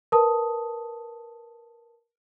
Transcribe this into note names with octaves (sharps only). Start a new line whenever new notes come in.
A#4 B4 A5 D#6